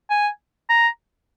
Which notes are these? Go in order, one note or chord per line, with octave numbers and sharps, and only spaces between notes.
G#5
A#5